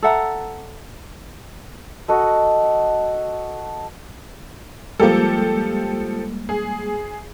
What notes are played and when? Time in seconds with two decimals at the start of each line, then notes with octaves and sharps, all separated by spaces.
0.02 A4 E5 F#5 A#5
2.08 F#4 A4 D#5
5.00 F3 G3 G#3 A#3 G4 A4
6.49 G#4